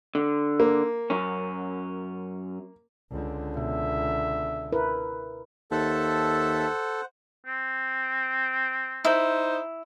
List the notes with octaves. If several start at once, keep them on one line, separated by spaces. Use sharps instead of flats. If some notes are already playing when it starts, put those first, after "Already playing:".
D3
A#3
F#2 C#4
C#2 D3
B2 E5
E4 A#4 B4
D#2 A4 C5 E5 F#5 A5
C4
D#4 E4 C5